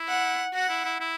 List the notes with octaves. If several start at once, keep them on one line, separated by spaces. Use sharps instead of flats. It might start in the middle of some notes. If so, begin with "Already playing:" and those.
Already playing: E4
F#5
F#4 F#5
E4
E4
E4